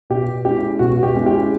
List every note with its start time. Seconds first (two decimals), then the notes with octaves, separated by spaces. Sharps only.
0.10 B2 G4
0.45 G#3 C#4 E4 G4
0.79 B2 F#4
0.98 F#4
1.03 G4
1.14 G#3 C#4 E4
1.26 G4